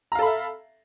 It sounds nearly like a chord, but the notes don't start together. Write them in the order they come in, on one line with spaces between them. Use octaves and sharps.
A#5 F5 A4 B5 E5